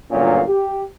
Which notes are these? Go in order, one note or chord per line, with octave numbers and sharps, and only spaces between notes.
G1 F#2 A#2 C#4 F5
G4